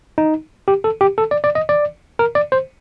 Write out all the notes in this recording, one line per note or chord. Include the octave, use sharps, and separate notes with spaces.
D#4
G4
A4
G4
A4
D5
D5
D#5
D5
A#4
D5
C5